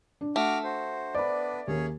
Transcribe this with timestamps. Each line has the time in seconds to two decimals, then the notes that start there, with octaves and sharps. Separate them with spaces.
0.21 D4
0.36 A3 F#4 D6 F6
0.64 F#4 C5
1.15 B3 D4 B4 C5 D5 B5
1.67 D#2 A#3 C#4 G#4 C#5